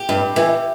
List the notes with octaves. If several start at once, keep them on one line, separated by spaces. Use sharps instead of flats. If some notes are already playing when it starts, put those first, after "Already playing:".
Already playing: G4
G2
E3